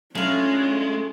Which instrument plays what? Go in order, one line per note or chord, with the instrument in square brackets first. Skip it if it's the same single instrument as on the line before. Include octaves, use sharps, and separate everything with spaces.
[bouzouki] A2 F4 [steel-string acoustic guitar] F#3 D4 [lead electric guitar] G#3 [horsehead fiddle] C#4